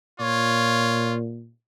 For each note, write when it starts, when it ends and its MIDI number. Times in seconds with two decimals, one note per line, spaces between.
0.20 1.51 46
0.20 1.15 65
0.20 1.17 73